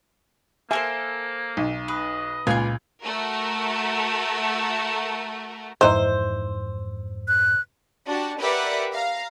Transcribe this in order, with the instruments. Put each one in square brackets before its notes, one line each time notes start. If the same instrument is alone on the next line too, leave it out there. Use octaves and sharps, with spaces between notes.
[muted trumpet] A#3 [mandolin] A4 A#4 C5 [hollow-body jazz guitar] E5 G#5
[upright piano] B1
[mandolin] B4 [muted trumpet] D#5
[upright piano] C#2 B4 G#6 [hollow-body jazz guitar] A#2 [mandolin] F4 D5 G#5
[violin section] A3 F#4 A#4
[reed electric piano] F2 G#2 E6 [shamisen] D#3 E3 D#4 [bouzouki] C5
[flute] F#6
[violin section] D4 F#4 G4 A5
G4 A#4 B4 D5 E5 F#5
F5 A#5